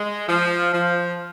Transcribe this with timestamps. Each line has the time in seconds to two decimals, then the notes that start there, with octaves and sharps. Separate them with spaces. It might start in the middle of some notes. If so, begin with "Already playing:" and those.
Already playing: G#3
0.29 F3
0.73 F3